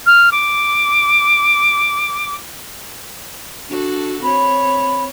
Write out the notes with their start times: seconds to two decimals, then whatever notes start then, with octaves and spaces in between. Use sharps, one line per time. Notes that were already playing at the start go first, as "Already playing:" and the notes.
0.06 F6
0.32 D6
3.70 D4 F#4 A4
4.22 C4 C#5 B5